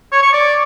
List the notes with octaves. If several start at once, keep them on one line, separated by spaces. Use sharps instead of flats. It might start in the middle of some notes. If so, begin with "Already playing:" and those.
C#5
C#6
D5